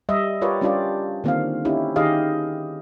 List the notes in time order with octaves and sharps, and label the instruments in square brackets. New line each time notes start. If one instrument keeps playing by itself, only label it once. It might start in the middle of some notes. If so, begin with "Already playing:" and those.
[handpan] G3 D#5 E5
F4 G4 A#4 B4 C#5 D5
G3 C#4 D4 F4 G4 D5
D3 D#3 A#3 C4 F4 F5
C#4 D#4 E4 G4
D#3 G4 G#4 D#5 F5